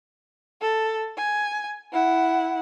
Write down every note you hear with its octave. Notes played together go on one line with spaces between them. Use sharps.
A4
G#5
E4 F#5